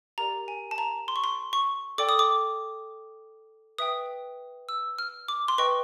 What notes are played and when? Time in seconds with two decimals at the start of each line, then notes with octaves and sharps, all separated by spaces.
0.18 G4 A#4 D5 A#5
0.48 G#5
0.71 A5
0.78 A#5
1.08 C6
1.16 C#6
1.24 C6
1.53 C#6
1.98 A4 D5 G5 D6
2.09 D#6
2.19 D6
3.78 B4 E5 G5 D#6
4.69 E6
4.99 F6
5.28 D6
5.48 C6
5.58 B4 D#5 G5 C#6